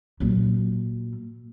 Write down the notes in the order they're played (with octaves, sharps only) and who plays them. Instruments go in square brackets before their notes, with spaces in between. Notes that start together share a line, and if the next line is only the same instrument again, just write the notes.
[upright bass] A#2 F#3